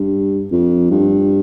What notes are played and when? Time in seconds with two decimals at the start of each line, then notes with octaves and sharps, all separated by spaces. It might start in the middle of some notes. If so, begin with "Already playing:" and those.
Already playing: G2
0.52 F2
0.91 G2